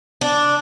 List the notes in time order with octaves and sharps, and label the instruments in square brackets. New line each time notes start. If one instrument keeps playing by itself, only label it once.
[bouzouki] D4